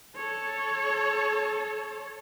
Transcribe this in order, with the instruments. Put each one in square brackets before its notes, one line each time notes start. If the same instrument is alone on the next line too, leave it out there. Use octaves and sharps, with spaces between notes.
[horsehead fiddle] A4 C#5